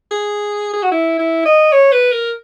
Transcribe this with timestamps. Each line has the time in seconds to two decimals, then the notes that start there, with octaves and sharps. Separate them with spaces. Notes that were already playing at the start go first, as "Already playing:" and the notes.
0.11 G#4
0.74 G#4
0.83 F#4
0.92 E4
1.19 E4
1.46 D#5
1.72 C#5
1.93 B4
2.12 A#4